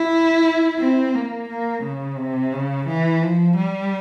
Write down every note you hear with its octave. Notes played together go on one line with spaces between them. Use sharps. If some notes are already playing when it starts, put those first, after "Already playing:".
Already playing: E4
C4
A#3
A#3
C#3
C3
C#3
E3
F3
G3